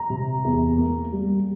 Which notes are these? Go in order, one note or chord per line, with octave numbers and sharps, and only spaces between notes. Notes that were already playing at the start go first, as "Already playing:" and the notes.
Already playing: A#5
C3
E2
A#3
G3